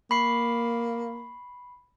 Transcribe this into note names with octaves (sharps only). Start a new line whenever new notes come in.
A#3 B5 C#6 C7